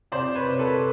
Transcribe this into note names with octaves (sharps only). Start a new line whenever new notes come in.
C3 C5 D5
B4 C#5
C3
A4 B4